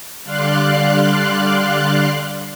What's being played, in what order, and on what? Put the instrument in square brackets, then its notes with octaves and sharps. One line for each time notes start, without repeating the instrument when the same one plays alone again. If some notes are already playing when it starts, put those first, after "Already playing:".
[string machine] D3 G3 D5 F5 C6 F#6